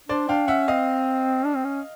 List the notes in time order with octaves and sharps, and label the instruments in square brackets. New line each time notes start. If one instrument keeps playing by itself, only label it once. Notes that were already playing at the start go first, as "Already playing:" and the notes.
[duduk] D4 [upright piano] C5 D5
[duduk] D4 [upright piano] F5 G5
[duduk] C#4 [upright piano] E5 F#5
[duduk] C4 [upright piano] D#5 F5
[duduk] D4
C4
C#4